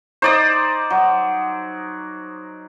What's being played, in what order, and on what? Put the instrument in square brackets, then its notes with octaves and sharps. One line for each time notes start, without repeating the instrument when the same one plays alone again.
[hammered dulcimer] D#4 [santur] C5 D5 D#6
[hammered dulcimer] F#3